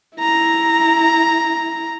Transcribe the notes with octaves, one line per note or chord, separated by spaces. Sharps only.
E4 A#5